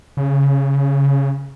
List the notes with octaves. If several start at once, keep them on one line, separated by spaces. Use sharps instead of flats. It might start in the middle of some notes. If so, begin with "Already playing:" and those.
C#3